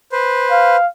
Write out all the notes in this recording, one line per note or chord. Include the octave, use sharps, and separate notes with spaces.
B4 C5
F5